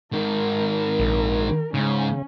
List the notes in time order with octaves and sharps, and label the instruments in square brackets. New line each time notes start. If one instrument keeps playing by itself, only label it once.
[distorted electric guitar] G#2 D#3 [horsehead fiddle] A#4
[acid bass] A#1
[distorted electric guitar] G#2 [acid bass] C#3 [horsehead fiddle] C#4